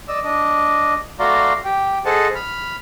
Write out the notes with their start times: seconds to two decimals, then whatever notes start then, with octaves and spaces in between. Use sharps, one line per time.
0.08 D5 D#5 E6
0.24 D4 D#5
1.20 A3 F#4 D5 F5 A#5 C6
1.65 G4 G5
2.05 G#4 A4 C5 D#5 F#5 A5
2.35 B5 F6